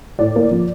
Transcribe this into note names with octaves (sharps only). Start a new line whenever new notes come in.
A2 D5
A#3
F3